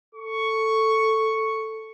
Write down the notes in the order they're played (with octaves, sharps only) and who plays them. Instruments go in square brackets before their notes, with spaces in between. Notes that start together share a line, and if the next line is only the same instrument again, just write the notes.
[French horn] A4 [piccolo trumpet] C#6